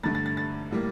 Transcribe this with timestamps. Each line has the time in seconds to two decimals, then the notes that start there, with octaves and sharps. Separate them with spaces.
0.03 G2 D3 A3 A6
0.15 A6
0.26 A6
0.37 A6
0.71 A2 G3 A#3